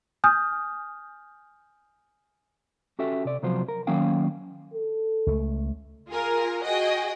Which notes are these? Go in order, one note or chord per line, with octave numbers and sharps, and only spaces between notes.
G#5 D#6 F6 G6
C#4 F#4 G4 A4 E5
C3 D5
C3 F3 F#3 F4 C5
A#4
D#3 F#3 A#3 C#4 F5 G5
A4
C#2 A3
F4 G#4 A#4
F#4 G#4 D#5 G5